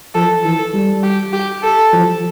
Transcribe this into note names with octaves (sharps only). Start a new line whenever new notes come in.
F3 A4
E3 A4
G3
G4
G4
A4
F3